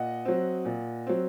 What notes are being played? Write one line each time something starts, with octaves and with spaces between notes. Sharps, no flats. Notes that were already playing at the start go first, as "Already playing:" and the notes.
Already playing: A#2 D#5 F#5
F#3 C4
A#2
F#3 C4